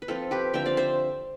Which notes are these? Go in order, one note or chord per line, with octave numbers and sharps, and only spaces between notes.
B4
F3 C4 F4 A4
G4 B4
D3 F3 C4 E5 G5
D5 F5
C5 E5